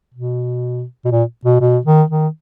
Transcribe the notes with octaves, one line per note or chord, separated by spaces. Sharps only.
B2
B2
A#2
B2
B2
D#3
D#3